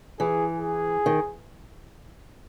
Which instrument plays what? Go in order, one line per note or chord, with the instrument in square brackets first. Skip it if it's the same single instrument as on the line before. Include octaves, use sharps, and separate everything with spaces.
[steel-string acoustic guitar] E3 [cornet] G#4
[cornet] G#4
[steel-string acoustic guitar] D#3